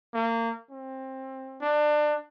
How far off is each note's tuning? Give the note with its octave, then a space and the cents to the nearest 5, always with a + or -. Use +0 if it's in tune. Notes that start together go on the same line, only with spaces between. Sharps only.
A#3 -25
C4 +20
D4 +25